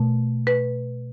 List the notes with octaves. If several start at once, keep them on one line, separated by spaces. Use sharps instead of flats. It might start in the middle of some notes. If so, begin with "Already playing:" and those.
Already playing: B2 A3
B4